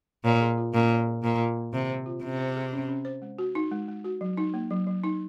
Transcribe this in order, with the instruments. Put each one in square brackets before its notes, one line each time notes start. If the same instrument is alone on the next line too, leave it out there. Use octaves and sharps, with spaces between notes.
[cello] A#2 [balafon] C#5
[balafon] G#4
F4
[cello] A#2 [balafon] C#4
[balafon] C#5
G#4
[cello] A#2 [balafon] C5
[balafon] F4
A#3
[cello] C3 [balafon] D#3
[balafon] C5
F4
[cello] C3 [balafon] C#4
[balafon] C5
G#4
C#4
C#4
C5
G#3
F#4
D#4
G#3
G#3
F#4
F#3
D#4
A#3
F#3
F#3
D#4